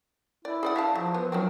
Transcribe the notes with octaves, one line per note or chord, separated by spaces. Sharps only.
E4 D5
G#4 D5 F#5
E5 F5 A5
F3 F#3
B3
D#3 F3 F#3 C4